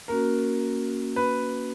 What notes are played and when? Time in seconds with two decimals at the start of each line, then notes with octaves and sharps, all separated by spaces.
0.08 A#3 C#4 F#4 A#4
1.16 B4